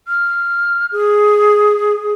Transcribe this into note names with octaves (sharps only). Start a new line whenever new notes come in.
F6
G#4